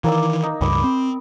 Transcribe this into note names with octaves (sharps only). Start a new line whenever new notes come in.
D#3 E3 A#3 D5 E6
D#4
C#2 G2 B5 D6
C4